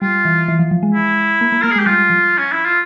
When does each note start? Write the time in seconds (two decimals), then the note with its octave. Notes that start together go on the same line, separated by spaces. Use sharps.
0.02 G3 F4
0.25 E3
0.48 E3
0.59 F3
0.71 F3
0.83 G#3
0.94 E4
1.41 A#3
1.52 A#3
1.62 A#3 A#4
1.71 G#4
1.76 G#3 G4
1.86 G3 F4
2.10 F3
2.38 C#4
2.52 E4
2.65 F4